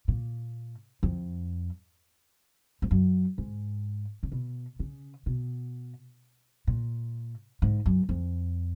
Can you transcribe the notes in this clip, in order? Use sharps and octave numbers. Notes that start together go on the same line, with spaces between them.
A#2
F2
G#2
F#2
G#2
C#3
B2
C#3
B2
A#2
G#2
F#2
F2